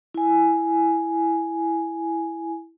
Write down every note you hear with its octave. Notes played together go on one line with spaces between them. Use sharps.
E4 G#5